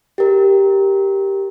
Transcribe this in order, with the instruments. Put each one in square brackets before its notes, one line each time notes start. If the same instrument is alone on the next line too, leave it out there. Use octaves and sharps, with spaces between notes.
[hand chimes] G4 A#4